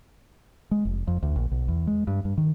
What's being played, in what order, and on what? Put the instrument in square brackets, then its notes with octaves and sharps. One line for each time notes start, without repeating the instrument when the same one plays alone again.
[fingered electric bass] G#3
F1
F2
D2
A#1
B1
E2
G#3
G2
G2
D#3